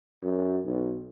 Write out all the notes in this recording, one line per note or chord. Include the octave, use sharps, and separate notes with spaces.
F#2
B1